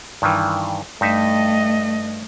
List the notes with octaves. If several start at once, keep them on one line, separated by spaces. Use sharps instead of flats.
G2 D#3 E3
G2 A3 D#4 D#5 E5